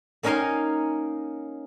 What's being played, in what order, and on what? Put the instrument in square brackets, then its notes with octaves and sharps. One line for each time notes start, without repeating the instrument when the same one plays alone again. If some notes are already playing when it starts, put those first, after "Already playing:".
[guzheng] A#3 C#4 D#4 A#4 G#5 C6